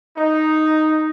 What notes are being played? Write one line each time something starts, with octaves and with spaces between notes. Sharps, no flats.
D#4